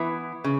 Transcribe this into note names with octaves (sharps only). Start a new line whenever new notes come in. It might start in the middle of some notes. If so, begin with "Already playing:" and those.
Already playing: E3 B3 E4
C#3